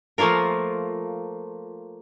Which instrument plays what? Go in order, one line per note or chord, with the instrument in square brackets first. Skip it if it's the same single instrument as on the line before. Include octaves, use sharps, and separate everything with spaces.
[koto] F3 A3 A#3 F4 A#4